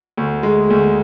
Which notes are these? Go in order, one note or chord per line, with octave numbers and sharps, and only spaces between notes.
D2
G#3
D2